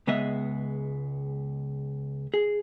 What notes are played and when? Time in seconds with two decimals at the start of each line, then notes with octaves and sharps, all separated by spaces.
0.07 C#2 G#3 B3 D#5 E5
2.34 G#4